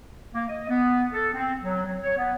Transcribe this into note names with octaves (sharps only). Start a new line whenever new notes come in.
A#3
D#5
B3
A4
C4
F#3
F#3
C#5
B3